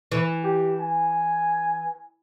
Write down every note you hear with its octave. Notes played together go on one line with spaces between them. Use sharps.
E3
G4
G#5